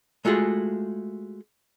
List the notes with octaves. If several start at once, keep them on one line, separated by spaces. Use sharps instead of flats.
G#3 A3 F4 F#4 G#4